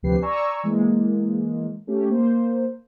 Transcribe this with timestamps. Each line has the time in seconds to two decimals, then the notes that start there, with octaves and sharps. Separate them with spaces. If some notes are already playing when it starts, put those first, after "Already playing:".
0.03 D2 C3 F3 G4 B4 C7
0.22 D5 G#5 A#5 C#6 E6
0.63 E3 G#3 A#3
1.87 A3 C#4 G4
2.10 A#3 C5